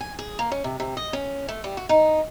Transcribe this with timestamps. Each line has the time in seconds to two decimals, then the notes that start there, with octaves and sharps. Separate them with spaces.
0.01 G#5
0.19 G#4
0.39 A#3
0.52 C#4
0.64 C3
0.80 C3
0.97 D#5
1.13 C#4
1.49 A3
1.64 G3
1.77 F#4
1.89 D#4